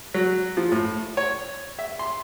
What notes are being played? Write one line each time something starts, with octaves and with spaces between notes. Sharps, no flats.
F#3
F3
A2
C#5
E5
C6